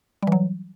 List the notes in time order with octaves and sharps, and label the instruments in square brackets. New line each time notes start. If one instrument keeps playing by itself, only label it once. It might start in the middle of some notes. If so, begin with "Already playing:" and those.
[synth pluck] G3
E3
F#3